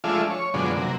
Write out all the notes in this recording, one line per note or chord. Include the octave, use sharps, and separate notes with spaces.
F3 G#3 A3 D4 F4 E5
C#5
F#2 B2 D3 F3 G#3 D4
C3 F#3 A#3